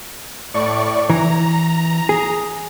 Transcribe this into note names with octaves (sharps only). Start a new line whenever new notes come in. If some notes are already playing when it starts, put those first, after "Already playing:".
A2 D5 C#6
E3 A#5
G#4